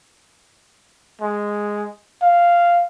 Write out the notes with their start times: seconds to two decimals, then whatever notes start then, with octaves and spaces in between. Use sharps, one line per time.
1.21 G#3
2.22 F5